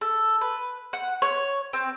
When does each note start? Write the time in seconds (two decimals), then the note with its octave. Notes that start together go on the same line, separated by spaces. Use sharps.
0.01 A4
0.41 B4
0.93 F#5
1.22 C#5
1.73 C4